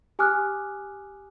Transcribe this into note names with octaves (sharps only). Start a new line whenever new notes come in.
G4 G#5 D6 D#6 F6 F#6